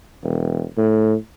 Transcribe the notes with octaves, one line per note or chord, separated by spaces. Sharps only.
E1
A2